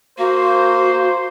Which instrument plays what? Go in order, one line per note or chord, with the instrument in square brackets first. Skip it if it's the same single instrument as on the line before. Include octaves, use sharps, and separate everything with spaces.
[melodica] A#3 [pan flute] F#4 [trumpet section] C5